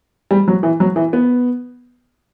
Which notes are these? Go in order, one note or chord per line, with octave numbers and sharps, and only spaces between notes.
G3
F#3
E3
F#3
E3
B3